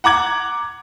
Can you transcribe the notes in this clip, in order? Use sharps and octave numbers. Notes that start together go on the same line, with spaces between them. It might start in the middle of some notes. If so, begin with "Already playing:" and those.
F#5 A#5 D6 G#6 F#7